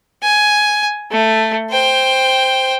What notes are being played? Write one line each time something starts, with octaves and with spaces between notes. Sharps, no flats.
G#5
A3
C5 G5